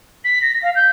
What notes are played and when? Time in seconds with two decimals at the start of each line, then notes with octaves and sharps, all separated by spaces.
0.24 B6
0.42 A#6
0.62 F5
0.75 G6